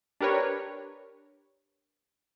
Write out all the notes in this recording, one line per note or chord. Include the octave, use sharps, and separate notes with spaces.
D4 G4 A#4 B4 C#5